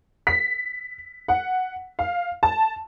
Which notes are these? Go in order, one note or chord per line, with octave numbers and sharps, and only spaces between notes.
B6
F#5
F5
A5